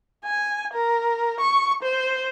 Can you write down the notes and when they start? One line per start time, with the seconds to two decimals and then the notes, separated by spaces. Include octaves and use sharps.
0.25 G#5
0.74 A#4
1.40 C#6
1.83 C5